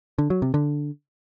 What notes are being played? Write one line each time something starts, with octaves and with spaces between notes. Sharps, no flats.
D3
F#3
C3
D3